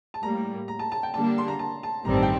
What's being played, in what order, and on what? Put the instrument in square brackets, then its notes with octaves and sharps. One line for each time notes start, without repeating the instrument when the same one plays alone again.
[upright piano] A5
[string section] A2 G3 A#3 [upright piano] A#5
[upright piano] A#5
A5
A5
G5
[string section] D3 G3 A#3 D4 [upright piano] A5
[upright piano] C6
A#5
A5
A5
[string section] A1 G2 D#3 G3 C4 [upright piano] A#5
[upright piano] A5
G5